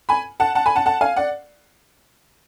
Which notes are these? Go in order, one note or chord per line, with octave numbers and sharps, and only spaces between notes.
G#5 B5
F#5 A5
F#5 A5
G#5 B5
F#5 A5
F#5 A5
F5 G#5
D5 F#5